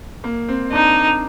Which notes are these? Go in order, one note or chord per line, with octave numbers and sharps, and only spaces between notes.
A#3
C4
D4 D#4